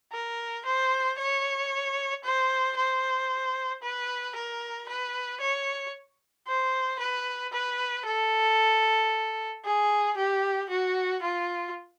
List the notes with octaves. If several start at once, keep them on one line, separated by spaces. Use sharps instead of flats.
A#4
C5
C#5
C5
C5
B4
A#4
B4
C#5
C5
B4
B4
A4
G#4
G4
F#4
F4